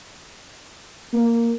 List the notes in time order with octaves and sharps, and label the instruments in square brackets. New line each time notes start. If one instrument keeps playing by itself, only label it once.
[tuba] A#3